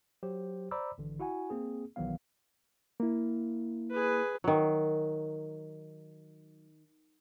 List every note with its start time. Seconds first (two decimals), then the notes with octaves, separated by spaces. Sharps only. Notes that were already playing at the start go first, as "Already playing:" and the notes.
0.23 F#3 G4 C5
0.71 C5 D5 A#5 B5 D6 E6
0.98 G#1 D3 E3
1.20 E4 F#4 F#5 G#5
1.50 A#3 C4 G#4
1.96 B1 D#3 E3 F#3 B3 F5
3.00 A#3 E4
3.91 G#4 B4
4.44 D#3 F#3